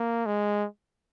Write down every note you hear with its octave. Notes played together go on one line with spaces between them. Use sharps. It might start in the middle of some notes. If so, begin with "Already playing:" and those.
Already playing: A#3
G#3